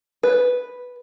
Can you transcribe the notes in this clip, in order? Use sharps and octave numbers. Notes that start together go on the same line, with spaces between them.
B4